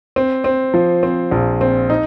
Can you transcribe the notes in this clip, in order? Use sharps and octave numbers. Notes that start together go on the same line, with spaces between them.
C4
C4
F3
C4
A#1
C4
D#4